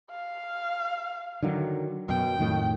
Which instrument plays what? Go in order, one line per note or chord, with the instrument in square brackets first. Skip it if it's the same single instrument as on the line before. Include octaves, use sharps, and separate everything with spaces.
[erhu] F5
[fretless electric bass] D3 D#3 F#3
[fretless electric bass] F#2 B2 [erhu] G5
[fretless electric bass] F2 A2 D#3